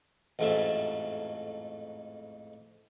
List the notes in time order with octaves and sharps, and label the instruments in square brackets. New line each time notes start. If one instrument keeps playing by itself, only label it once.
[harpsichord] A1 F2 G#2 A3 E5 A5